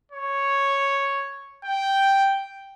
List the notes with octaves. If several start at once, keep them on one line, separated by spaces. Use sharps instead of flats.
C#5
G5